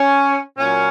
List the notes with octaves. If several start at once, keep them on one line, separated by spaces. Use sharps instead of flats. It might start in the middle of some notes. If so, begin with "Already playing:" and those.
Already playing: C#4
A#2 F#3 C#4